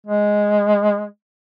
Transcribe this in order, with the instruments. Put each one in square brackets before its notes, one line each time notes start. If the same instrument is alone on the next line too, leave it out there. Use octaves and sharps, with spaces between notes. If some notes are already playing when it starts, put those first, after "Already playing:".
[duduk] G#3